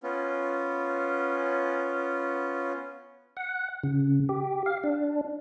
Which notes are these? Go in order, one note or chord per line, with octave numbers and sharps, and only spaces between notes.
B3 C#4 F4
F#5
C#3
G4
F5
D4